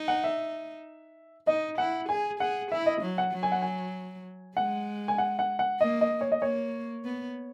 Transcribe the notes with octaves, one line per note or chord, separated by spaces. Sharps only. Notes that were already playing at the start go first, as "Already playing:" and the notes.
Already playing: D#4
F#5
E5
D#4 D#5
E4 F#5
G#4 G#5
G#4 F#5
E4 E5
D#5
F#3
F#5
F#3
G#5
F#5
G#5
G#3 F#5
G#5
F#5
F#5
F#5
A#3 D#5
D#5
C#5
D#5
A#3 C#5
B3